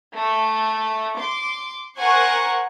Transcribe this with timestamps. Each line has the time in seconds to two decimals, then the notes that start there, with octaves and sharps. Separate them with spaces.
0.14 A3
1.16 C6 D6
1.98 A#4 C5 F#5 G#5 C#6 F#6